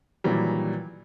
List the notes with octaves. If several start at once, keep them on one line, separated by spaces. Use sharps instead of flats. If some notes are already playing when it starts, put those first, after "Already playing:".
A#2 D#3 E3 F#3 G3